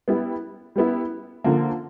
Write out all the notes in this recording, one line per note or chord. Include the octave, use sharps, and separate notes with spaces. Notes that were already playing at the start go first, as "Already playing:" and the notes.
G3 B3 E4
G3 B3 E4
D3 F3 A#3